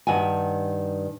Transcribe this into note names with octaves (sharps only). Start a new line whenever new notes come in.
G2 D#3 F#5 G#5